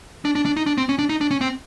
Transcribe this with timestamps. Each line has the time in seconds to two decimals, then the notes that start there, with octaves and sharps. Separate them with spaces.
0.25 D4
0.35 D4
0.45 D4
0.57 D#4
0.66 D4
0.78 C4
0.89 C#4
0.99 D4
1.09 D#4
1.21 D4
1.31 C#4
1.41 C4